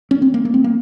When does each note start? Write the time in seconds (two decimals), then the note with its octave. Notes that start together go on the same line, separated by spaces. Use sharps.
0.11 C#4
0.22 C4
0.34 A#3
0.45 A#3
0.54 C4
0.64 A#3